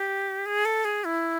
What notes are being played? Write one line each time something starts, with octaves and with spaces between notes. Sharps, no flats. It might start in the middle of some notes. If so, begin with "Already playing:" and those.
Already playing: G4
G#4
A4
G#4
E4